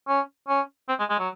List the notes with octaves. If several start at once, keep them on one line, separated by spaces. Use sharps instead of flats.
C#4
C#4
C4
G#3
G#3
F#3